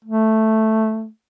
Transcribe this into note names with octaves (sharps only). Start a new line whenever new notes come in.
A3